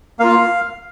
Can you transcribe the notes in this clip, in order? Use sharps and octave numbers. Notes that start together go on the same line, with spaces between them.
A#3 F4 F5